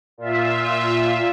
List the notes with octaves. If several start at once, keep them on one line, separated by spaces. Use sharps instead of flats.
A#2 F4 E5